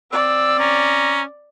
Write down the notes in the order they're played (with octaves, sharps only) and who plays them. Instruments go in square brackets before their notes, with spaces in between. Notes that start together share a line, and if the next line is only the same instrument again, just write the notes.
[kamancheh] C4 D5 [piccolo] E6
[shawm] C#4 [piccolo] A#5